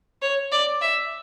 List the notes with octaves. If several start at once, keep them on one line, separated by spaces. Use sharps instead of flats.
C#5
D5
E5